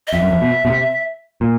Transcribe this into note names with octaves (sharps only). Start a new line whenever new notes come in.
D#5
F2 E5
F#2
F2
B2
B2
C3
A#2